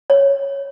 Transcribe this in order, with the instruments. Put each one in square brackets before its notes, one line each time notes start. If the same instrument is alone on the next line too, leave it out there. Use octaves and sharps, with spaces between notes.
[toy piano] C#5